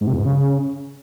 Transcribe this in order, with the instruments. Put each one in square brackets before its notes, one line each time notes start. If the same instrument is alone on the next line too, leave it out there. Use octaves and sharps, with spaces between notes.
[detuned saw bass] G#2
C3
E2
G#2
C#3